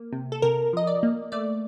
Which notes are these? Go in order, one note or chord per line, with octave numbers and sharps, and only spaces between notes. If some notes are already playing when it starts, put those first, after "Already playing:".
Already playing: A#3
C3
A4
C3 A#4
F3 D#5
D5
A#3
A3 D5